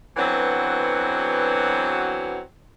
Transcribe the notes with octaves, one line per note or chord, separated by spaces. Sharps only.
D3 E3 F#3 B3 C4 F#4